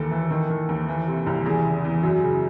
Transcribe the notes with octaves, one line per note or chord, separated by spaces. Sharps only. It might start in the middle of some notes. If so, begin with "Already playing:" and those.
Already playing: D#2 E3 A4
E3
D#3
D#3
D#2
E3
C3
C2
E2 G#4
C#3
E2
F#2
C#3